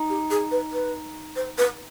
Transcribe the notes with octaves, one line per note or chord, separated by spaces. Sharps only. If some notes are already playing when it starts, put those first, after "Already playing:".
Already playing: D#4
G4
G#4
B4
B4
C5
B4